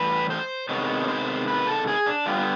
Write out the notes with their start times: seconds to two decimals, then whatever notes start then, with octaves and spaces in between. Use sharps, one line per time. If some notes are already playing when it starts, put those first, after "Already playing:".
Already playing: A2 E3 G3 B4
0.30 C5
0.69 C3 D#3 G#3 B3 C#5
1.04 C#5
1.08 C5
1.48 B4
1.67 A4
1.87 G#4
2.06 D4
2.26 D3 G3 B3 F4